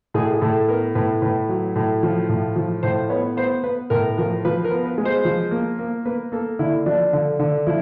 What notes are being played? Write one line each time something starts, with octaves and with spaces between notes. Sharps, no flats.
A2 G#4
G#4
A2 A4
B3 A#4
A2 B4
A2 B4
F#3
A2
F3
A2
F3
A2 C5
B3 C#5
B3 C5
B3 B4
A2 A#4
F3 A#4
F3 B4
A#4
B3
B4
G#3
C5
F3
A#3
A#3
A#3 B4
A#3 A4
D3 E4
F3 D4
D3
D3
F3 E4